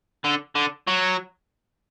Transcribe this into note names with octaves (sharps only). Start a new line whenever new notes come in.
D3
D3
F#3